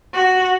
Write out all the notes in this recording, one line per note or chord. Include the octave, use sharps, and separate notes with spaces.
F#4